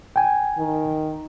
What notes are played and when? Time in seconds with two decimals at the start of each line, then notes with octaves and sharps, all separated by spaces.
0.16 G5 G#5
0.58 D#3